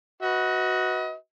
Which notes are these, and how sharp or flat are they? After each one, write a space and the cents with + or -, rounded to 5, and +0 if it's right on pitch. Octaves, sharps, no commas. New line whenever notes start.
F#4 +0 B4 +0 D#5 +35